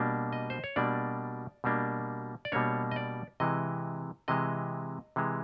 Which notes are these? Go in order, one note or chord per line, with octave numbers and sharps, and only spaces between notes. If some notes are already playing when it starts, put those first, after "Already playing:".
Already playing: B2 G3 A#3 D4
D#5
C5
C#5
B2 G3 A#3 D4 D5
B2 G3 A#3 D4
D5
B2 G3 A#3 D4 C#5
D#5
D5
C3 E3 G#3 D#5
C3 E3 G#3 D#5
C3 E3 G#3